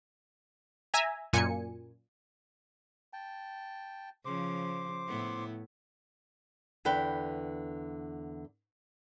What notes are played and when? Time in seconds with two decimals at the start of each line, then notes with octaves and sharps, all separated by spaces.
0.94 E5 G#5 A#5
1.33 F#2 A#2 G#5 C#7
3.13 G5 A5
4.25 C#3 F3 C5 D6
5.07 A2 B3 E4
6.85 E2 D3 B4 G5